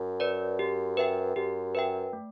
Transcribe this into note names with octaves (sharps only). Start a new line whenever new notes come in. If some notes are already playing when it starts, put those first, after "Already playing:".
Already playing: F#2
B4 D5
G4
B4 E5 G5
F#2 G4
B4 E5 G5
A3